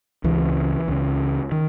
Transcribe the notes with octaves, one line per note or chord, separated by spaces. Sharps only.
C#2 C#3 E3
C#2 C#3
D#3